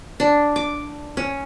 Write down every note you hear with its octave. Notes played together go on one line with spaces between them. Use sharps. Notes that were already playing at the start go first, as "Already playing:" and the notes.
D4
D6
C#4